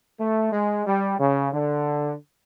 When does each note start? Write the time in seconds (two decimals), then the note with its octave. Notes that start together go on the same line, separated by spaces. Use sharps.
0.19 A3
0.52 G#3
0.87 G3
1.19 C#3
1.53 D3